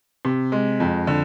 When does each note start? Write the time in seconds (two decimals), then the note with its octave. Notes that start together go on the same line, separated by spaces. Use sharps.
0.25 C3
0.52 G#3
0.80 F2
1.07 D3